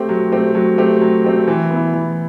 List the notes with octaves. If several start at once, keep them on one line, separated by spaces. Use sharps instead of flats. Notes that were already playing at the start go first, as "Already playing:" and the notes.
Already playing: A3 C4 G4
F#3
A3 C4 G4
F#3
A3 C4 G4
F#3
A3 C4 G4
E3
B3 E4
E3